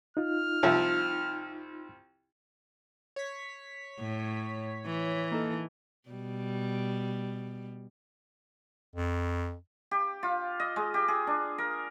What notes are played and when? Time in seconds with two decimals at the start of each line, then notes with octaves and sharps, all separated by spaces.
0.17 D#4 F4 F6
0.63 C2 F3 E5
3.16 C#5 B6
4.00 A2
4.86 E3
5.31 A#3 D#4 A4
6.09 B2 G3
8.96 F2
9.91 G4
10.23 F4
10.60 D#5
10.76 G#3
10.94 G4
11.08 G#4
11.27 D4
11.58 A#4